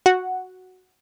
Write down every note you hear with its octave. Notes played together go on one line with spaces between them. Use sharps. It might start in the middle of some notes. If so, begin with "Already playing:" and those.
F#4 F#5